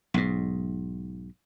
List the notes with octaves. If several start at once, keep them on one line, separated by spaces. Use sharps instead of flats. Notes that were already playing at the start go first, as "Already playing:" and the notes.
B1 G#2